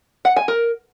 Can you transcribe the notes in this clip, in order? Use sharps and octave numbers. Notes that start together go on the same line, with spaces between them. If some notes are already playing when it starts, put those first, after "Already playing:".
F#5
G#5
A#4